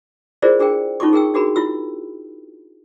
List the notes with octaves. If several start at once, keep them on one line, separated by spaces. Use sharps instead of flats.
E4 F4 G#4 A#4 C5 D5
D4 G#4 A#4 G5
C#4 D#4 F4 A4 C#6 D6
G#4 A#4 G5 E6
D4 F#4 G#4 A#4 B5
E4 F4 E6